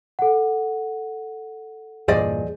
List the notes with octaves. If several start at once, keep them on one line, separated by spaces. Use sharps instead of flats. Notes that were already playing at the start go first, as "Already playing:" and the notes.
A4 F#5
E2 G2 A#2 G#4 C5 D5 D#5